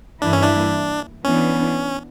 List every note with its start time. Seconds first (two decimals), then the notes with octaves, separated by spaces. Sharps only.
0.21 G2 E3 A#3 D4 E4
0.33 C#4
0.43 D4
1.24 E3 B3 C#4 D4